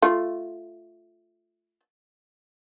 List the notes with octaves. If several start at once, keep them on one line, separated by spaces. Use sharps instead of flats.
A3 F4